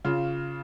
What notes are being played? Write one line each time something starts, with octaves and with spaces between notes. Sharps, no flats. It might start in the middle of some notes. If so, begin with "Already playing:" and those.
C#3 F4